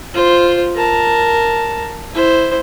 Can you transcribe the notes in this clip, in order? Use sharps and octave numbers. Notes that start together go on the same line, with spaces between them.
F4 C5
A#4 A5
E4 C5